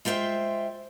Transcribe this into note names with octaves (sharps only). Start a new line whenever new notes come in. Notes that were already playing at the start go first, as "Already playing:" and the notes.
G#3 F4 C5 E5 G5